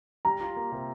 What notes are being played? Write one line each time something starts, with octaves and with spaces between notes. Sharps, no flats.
G3 A#5
F4
A#3
C3